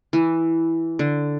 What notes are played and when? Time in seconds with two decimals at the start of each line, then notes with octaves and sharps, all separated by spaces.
0.13 E3
0.99 D3